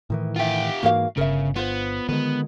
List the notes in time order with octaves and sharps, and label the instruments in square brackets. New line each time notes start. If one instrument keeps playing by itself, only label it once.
[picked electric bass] A2 D#3 E3
[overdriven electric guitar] F4 G4 [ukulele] E5 G5
[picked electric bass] G#2 E3 A#3 [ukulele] F#4 A#4 F5
[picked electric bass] G1 [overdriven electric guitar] C#3 [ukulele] A#4 E5
[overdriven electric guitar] B3 [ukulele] F4 C5
[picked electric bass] D3 D#3 G#3 [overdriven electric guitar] B3